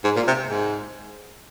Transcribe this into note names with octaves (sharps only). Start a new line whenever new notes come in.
G#2
A#2
C3
G#2